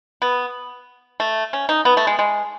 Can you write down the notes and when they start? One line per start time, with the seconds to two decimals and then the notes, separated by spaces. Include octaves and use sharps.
0.22 B3
1.20 A3
1.53 C#4
1.69 D#4
1.85 B3
1.97 A3
2.07 G#3
2.19 G#3